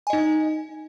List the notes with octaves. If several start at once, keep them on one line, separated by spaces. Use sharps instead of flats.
D#4 D#5 G#5